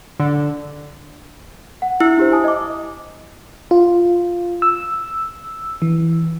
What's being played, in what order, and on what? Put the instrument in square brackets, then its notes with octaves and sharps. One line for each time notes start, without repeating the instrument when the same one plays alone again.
[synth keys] D3
[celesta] F#5
[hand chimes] E4 [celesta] E6
[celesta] D4 G4 C5
G#5 A5 D#6
D#5 D6
[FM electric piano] F4
E6
E3